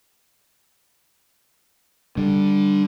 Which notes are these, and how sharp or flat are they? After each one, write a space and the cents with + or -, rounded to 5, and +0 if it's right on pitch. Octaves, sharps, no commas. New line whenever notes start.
D3 +0 G3 +0